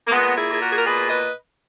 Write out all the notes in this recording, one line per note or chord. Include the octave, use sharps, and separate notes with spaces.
A#3
A#2 G#3 B3
E4 G#4
A#2 G#4
F#4 A#4
G#4
A#4
B2 G#4 B4
B4 D#5